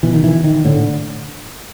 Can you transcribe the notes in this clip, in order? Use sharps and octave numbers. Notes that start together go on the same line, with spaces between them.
B2 E3
D#3
E3
D#3
A2 D3